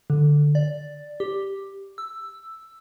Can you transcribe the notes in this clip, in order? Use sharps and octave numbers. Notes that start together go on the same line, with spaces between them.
D3
D5
G4
E6